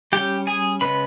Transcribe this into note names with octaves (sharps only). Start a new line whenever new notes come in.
G3 C#4 G4 G5
G#4 G#5
C#3 G#3 B3 B4 B5